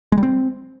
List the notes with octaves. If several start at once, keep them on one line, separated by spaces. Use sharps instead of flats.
G#3
G3
C4